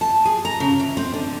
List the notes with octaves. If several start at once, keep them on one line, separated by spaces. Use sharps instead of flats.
A5
G#4
A#5
C#3
E3
C4
D3